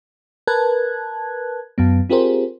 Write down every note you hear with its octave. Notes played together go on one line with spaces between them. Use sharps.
A#4 B4 A5 F#6 G#6
F#2 F#3 B3
C4 F4 G4 G#4 A#4 C5